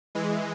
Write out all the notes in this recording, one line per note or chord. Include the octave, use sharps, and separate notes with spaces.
E3 G#3